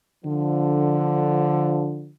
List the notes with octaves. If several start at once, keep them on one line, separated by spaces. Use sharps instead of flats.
D3 F3